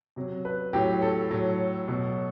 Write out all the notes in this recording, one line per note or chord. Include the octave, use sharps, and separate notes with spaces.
C3 F#3
B4
A2 F#3 G4
A4
A2 F#3
B2 F#3